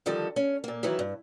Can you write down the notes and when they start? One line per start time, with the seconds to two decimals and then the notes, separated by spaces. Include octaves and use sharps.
0.06 D3 D#3 F3 G3 A4 D#5
0.36 C#4
0.64 A#2 A#3
0.83 D#3 E3 F#3 E4
0.99 G2